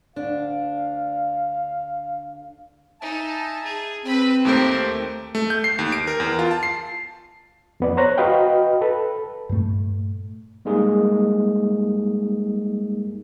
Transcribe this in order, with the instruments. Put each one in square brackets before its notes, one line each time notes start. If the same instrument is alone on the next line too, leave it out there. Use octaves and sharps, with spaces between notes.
[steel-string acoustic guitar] D2 D4 [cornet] F5
[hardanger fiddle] D#4 [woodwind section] E5 G#5 A5
[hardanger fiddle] G#4
[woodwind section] C4 [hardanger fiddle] B4 B5
[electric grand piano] D#2 A3 C5 [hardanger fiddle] G4 A#4
[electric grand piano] A3
G6
C7
D#2
D7
A#4
E2
F4
A5
C7
[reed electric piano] F2 B3 D5
C5 C#5 A#5 F#6
F#4 B4 D#5 F5 G5
A4 B4
[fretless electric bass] G2 A#2 A3
[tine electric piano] G3 G#3 A#3 D#4 G#4